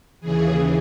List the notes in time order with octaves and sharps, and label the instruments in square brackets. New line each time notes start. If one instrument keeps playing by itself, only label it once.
[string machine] D#2 C#3 E3 G#4